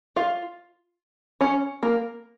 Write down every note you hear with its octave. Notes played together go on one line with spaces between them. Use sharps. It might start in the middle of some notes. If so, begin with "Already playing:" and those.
F4 F5
C#4 C#5
A#3 A#4